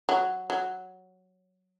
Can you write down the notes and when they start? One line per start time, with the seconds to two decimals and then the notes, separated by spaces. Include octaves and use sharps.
0.09 F#3
0.50 F#3